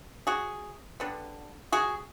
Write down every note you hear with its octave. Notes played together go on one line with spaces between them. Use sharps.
F#4 G#4
D3 G3 B3
F#4 G#4